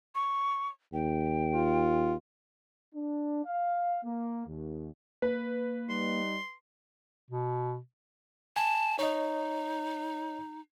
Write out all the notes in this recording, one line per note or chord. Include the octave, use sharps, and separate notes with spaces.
C#6
D#2 G5
F4
D4
F5
A#3
D#2
A#3 B4
G3 D#4 C6
B2
G#5 A5
D#4 C#5 D#5